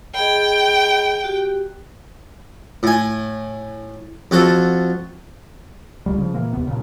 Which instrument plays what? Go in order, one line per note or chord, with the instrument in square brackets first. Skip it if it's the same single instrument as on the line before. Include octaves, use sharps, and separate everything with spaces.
[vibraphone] G#4 D#5 B5 [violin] G5
[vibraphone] F#4 G4
[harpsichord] A2 G#5
F2 F#4 A4
[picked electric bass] D1 C#2 G3
C#3 F3
A#2 E3 A#3
D#2 C3 B3
G2 A#2 C#3